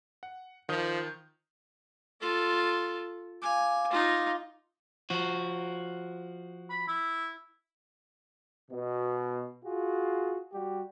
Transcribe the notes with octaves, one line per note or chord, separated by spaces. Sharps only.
F#5
D#3 F3 D#6 G6
F4 A4
F5 G#5 D6
D#4 F4
F3 F#4
B5
E4
B2
F4 F#4 G#4
G3 F#4 G4